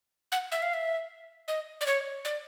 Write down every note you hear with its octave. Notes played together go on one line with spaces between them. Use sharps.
F#5
E5
F5
E5
D#5
D5
C#5
D5